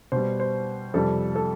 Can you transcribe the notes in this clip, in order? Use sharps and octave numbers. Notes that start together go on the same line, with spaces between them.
B2 G3 C5
C5
F2 C3 G3 A4
A4